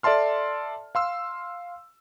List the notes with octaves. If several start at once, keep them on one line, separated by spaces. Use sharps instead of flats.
A4 D5 E5 A5 C6 F6
F5 C6 E6